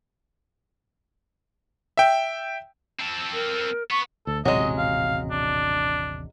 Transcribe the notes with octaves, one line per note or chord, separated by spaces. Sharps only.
E5 G5
C4 A4
A#4
B3 C#6
D2 A4
D#1 A1 C3 F#3 G#3 D#5
F5
D4